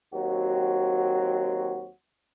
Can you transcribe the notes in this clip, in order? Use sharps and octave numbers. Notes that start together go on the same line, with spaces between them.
D#2 F#3 C4 F#4